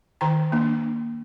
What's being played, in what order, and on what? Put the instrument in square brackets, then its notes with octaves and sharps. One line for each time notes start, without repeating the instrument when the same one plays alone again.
[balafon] D#3 G5 A#5
A#3 D4